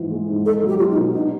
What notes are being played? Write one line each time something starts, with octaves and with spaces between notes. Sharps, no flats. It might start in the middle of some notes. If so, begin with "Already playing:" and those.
Already playing: G#2 E3 F3
G#3
G#2
D#4 A4
F#3
G4
B3 F4
D#4
B2
D4 D#4